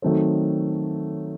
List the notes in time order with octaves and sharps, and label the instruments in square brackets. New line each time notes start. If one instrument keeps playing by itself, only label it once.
[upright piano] D#3 F#3 A3 C4